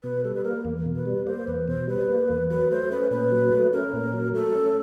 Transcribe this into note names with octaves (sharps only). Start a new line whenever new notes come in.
B2 B4
G3 A4
B4
A#3 A#4
E2
B2
B4
G3
A#3 C5
E2 B4
B2 C5
G3 B4
A#3
E2
F#3 B4
A3 C5
C#4 B4
A#2 B4
F#3
A3
C#4 A#4
A#2
F#3
A3 A4
C#4